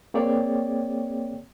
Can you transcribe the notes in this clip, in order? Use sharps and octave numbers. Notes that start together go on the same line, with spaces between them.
A#3 C4 G#4 C#5 D5 G5